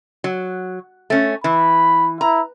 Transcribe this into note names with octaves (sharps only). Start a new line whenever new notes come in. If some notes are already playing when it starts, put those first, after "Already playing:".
F#3
A3 C#4
E3 B5
E4 A#5